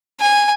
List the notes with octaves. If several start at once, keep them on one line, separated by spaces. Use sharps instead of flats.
G#5